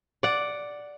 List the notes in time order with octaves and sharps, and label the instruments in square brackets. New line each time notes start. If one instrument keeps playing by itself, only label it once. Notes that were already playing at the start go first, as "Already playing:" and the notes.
[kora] D5 F#5